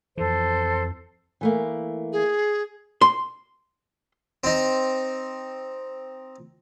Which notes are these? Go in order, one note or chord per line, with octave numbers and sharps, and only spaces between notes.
F2 E3 A4 C5
E3 A3 A#3
G#4
C6
C4 D#4